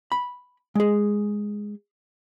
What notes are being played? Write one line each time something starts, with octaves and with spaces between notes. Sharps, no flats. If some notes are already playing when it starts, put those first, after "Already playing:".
B5
G#3 G#4